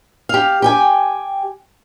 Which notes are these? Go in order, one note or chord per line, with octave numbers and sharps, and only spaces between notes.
G4 F5
G4 G5 G#5